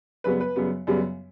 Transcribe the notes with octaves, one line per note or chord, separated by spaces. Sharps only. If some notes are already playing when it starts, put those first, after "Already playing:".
F#2 C#3 G3 B3 B4
B4
F#2 C#3 G3 B3
F#2 C#3 G3 B3